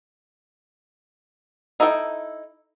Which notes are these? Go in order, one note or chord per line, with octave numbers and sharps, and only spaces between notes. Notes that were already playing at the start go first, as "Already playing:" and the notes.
D#4 E4 A4 D5 G5